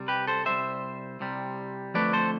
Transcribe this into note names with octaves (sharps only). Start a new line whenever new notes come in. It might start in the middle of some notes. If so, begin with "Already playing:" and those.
Already playing: C2 C3 G3
G4 B4
A4 C5
C2 C3 G3 C5 E5
C2 C3 G3
F2 D3 F3 A3 B4 D5
A4 C5